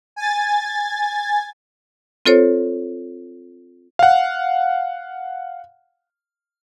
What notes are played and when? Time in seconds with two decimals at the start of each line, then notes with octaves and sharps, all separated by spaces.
0.16 G#5 A6
2.26 C4 F4 A4 C5 C#5
3.99 F5 F#5